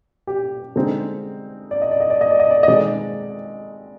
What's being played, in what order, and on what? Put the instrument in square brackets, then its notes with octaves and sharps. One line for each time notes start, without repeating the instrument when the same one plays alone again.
[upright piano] G4
D3 G#3 C4 D#4
D5
D#5
D5
D#5
D5
D#5
D5
D#5
D5
D#5
D#3 G#3 C4 D#4 D5